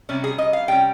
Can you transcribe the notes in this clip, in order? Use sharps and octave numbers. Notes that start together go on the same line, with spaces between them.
C3 G3 C#4
G#4
D#5
F5
C3 G3 C#4 G5